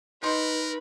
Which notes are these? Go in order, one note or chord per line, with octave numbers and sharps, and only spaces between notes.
D#4 A#4 B4 D#5 C6